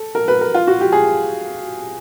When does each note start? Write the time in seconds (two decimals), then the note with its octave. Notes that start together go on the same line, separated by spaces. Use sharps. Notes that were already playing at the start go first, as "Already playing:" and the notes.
Already playing: A4
0.15 A#4
0.28 B4
0.41 A#4
0.54 F4
0.67 F#4
0.80 G4
0.92 G#4